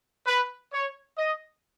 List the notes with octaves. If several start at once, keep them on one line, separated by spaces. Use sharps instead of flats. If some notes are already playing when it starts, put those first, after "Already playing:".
B4
C#5
D#5